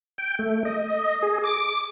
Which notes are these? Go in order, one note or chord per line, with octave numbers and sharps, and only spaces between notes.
G5
A3
D#5
G#4
D6